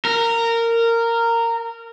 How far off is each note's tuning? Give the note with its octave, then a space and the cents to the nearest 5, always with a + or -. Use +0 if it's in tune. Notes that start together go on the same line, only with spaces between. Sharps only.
A#4 -15